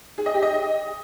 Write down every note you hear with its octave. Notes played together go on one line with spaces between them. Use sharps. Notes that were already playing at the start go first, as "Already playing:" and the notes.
G#4
D#5
G4
D#5